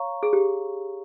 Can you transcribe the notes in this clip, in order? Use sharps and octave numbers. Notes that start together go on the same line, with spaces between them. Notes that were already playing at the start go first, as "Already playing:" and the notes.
Already playing: C#5 F5 A#5 C#6
G#4
G4